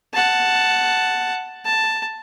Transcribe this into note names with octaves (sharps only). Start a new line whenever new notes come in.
F#5 A5
A5